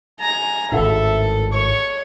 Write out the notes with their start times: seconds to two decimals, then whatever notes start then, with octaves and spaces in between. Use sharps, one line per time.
0.20 G#5 A#5
0.72 G#1 A2 A4 E5
1.53 C#5 C#6